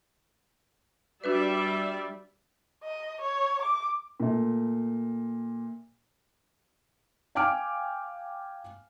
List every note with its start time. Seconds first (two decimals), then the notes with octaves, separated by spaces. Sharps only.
1.24 G3 D4 F#4 B4 D5 E5
2.83 D#5
3.22 C#5
3.62 D6
4.20 A#2 A3
7.35 F5 G5 G#5 D6 F6 D7